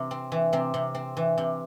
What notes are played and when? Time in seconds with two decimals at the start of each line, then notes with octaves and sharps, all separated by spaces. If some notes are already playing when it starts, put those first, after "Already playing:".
Already playing: C3 E3
0.11 C4
0.32 E3
0.53 C3 C4
0.74 C3
0.95 C4
1.17 E3
1.38 C3